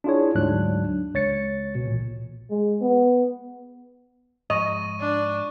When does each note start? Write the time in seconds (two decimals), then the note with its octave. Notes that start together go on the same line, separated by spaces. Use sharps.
0.04 D4 E4 F4 G#4 C#5
0.35 D2 G#2 F#3 D4 F#6
1.14 C#2 C#5 A6 C#7
1.75 B2
1.87 A1 A#2
2.50 G#3
2.81 B3
4.50 G#2 F3 D#5 C#6 D#7
5.00 D4